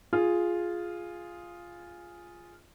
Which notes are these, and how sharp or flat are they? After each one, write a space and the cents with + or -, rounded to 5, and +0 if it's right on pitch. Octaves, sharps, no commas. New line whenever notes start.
F4 +0 G#4 +0